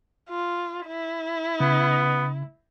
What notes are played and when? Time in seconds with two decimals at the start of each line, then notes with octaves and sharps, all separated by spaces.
0.30 F4
0.87 E4
1.60 C#3 B3